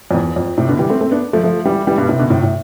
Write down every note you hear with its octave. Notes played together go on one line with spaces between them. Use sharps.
F2
E2
F2
A2 C3
B2 D3
E3 G3
A3 C4
A3 C4
B3 D4
F3 A3
F3 A3
E3 G3
E3 G3
G2 B2
A2 C3
B2 D3
A2 C3
A2